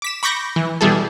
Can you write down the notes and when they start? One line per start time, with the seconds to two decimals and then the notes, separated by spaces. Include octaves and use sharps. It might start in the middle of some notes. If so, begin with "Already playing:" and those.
0.02 D6 B6 E7
0.23 B5 C#6 D6 G6 A#6
0.56 E3
0.81 B2 E3 G3 G#4 A4